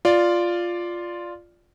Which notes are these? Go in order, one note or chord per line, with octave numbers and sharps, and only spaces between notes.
F4 D5